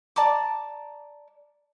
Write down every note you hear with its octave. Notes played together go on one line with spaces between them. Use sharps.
D5 A5 A#5 D6